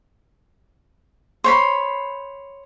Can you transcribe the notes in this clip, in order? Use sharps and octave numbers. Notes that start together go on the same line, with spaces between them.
C5 C#5 B5